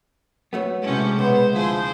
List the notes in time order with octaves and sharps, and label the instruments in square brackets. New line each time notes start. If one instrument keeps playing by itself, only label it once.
[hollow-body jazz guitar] F#3 A3 B3
[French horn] A2 [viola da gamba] C3 C#4 [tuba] G#3
[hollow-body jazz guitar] B1 [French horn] B3 [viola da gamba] C5
[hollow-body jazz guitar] D2 [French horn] F3 [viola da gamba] E4 G#4 C5